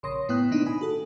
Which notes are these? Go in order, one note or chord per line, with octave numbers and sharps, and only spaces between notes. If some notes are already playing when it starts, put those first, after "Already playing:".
A#1 C#3 C#5 C6 D#6 A#6
A2 B3 E4 G5 D#6 F#6
B2 D#3 A#3 D4 D#4
G#5 B5 D#6
F#4 A4